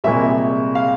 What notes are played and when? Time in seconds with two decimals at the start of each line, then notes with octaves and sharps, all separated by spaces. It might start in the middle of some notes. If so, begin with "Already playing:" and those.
0.04 C2 A#2 G#3 E5
0.75 F5